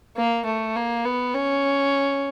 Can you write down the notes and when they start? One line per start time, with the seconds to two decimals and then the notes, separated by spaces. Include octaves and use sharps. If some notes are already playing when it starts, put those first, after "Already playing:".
0.17 A#3
0.46 A3
0.76 A#3
1.05 B3
1.34 C#4